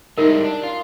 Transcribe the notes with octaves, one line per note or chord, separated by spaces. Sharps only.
G3 G#3 D#4 E4 A#4
D4
F4